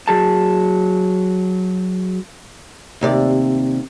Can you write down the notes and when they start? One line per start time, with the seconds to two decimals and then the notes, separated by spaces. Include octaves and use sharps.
0.08 F#3 G#4 A5
3.01 D#2 C3 D5